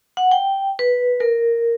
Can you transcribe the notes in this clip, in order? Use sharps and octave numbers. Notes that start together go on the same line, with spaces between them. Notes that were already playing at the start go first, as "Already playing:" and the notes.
F#5
G5
B4
A#4